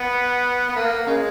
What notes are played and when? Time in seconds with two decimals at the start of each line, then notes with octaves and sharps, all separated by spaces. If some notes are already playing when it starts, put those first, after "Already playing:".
Already playing: B3
0.69 B3
0.76 A#3
1.07 C#3 G#3